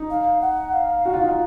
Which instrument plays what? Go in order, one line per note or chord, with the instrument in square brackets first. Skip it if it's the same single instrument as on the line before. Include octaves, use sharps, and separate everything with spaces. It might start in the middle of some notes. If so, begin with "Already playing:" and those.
Already playing: [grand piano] D#4
[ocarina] F5
F#5
F5
[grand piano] F#4
F4
D#4
F4